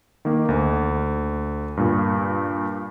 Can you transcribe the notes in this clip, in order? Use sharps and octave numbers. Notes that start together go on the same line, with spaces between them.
D#3 A#3
D2
G2 A#2